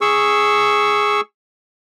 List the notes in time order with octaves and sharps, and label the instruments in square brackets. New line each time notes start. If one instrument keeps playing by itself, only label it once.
[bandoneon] G#4 C#6 E6